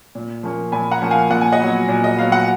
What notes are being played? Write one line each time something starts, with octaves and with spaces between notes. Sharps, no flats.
A#2
F3 A#3 C#4
A#2 G#5 B5
F#5 A#5
F3 A#3 C#4
F5 G#5
A#2 F#5
G#5
D#5 F#5
F#3 B3
A#2
D#5
F#3 B3 F5
F#5